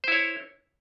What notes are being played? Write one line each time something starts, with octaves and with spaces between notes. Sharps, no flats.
E4 C5 C#5